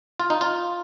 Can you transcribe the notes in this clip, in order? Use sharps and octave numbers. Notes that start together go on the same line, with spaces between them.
F4
D#4
F4